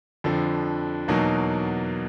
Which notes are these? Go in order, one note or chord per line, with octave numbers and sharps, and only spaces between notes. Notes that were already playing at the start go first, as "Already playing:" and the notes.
F2 D3 F3
E2 B2 F#3 A#3 D#4